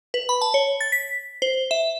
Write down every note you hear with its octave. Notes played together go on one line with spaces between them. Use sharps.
B4
B5
A5
C#5
A6
B6
C5
E5